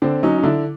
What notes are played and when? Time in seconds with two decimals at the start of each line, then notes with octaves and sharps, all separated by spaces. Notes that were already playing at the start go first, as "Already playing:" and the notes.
0.02 D3 C4 D4
0.23 F#3 C#4 D#4
0.38 D#4
0.43 D3 D4 E4